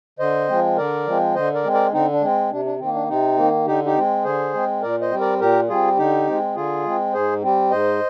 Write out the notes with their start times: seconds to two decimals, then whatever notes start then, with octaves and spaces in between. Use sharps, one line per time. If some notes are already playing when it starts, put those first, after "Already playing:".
0.19 D3 C5 D#5
0.48 F3 G#3 C4
0.77 D3 A#4 D5
1.06 F3 G#3 C4
1.35 D3 C5 D#5
1.54 A#4 D5
1.64 G#3 C4
1.73 A#4 D5
1.92 D3 C4 D#4
2.12 D4
2.21 G#3 C4
2.51 C3 D4
2.65 D4
2.79 D#3 A#3 C4
2.94 D4
3.09 C3 C4 D#4
3.37 D#3 A#3
3.66 D3 D#4 G4
3.86 D#4 G4
3.95 G#3 C4
4.24 D3 G#4 C5
4.54 G#3 C4
4.82 A#2 A#4 D5
5.01 C5 D#5
5.11 G3 C4
5.20 A#4 D5
5.40 A#2 G4 A#4
5.69 G3 C4 F4 G#4
5.98 D3 D#4 G4
6.27 G#3 C4
6.56 D3 F4 G#4
6.85 G#3 C4
7.14 G#2 G#4 C5
7.43 G3 C4
7.71 G#2 C5 D#5